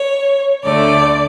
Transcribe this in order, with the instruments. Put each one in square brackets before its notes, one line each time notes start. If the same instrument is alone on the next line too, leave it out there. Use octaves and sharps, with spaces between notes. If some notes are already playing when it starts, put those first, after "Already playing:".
Already playing: [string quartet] C#5
D2 D3 A3 D5